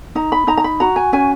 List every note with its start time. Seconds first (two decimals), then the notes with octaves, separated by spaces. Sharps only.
0.15 D#4 A#5
0.32 B5
0.47 D#4 A#5
0.57 A#5
0.64 B5
0.80 F#4 A#5
0.96 G#5
1.13 C#4 G#5